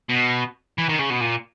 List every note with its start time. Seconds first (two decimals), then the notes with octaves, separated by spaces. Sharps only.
0.10 B2
0.78 E3
0.89 D#3
0.99 C#3
1.10 B2
1.20 A#2